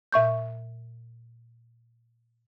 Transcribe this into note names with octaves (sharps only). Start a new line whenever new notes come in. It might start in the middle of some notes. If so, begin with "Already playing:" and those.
A#2 E5 C#6 G6